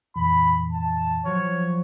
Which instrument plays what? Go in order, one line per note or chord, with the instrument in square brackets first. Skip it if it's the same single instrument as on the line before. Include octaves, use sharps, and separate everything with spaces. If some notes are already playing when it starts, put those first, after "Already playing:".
[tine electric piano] F2 A#2 E3 [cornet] B5
[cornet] A5
[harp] F3 F#3 [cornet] C#5